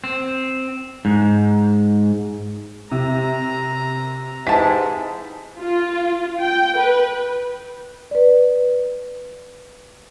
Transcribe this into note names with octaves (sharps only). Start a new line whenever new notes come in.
C4
G#2
C3 A#5
G#2 C3 E3 G#3 A5 B6
F4
G5
B4
B4 D5